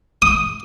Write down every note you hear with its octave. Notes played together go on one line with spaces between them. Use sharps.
D#6